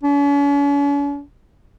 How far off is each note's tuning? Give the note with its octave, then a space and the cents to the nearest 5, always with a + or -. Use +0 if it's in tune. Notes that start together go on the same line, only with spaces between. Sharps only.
C#4 +45